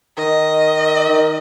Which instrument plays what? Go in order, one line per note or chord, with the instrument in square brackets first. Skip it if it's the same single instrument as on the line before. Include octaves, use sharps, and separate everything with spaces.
[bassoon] D#3 [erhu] D#5
[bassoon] D#3